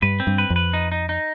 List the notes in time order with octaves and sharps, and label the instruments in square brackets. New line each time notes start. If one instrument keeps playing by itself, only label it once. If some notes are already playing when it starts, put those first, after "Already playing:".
[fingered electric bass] G2 [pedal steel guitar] B4
[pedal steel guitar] C4
[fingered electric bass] G2
[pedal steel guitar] B4
[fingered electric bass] F2
[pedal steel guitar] B4
D#4
D#4
D#4